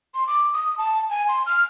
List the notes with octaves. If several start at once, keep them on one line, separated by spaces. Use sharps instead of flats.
C6
D6
D#6
A5
G#5
C6
F6